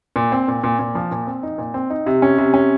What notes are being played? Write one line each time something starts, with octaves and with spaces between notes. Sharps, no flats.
A#2
C4
A#2
A#2
A#2
F3
A#2
C4
D#4
A#2
C4
D#4
C3
C#4
C3
C#4